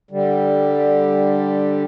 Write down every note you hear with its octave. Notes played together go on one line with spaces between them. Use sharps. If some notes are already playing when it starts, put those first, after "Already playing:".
D3 G3